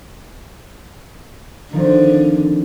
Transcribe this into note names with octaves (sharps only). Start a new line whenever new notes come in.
D3 D#3 F3 C4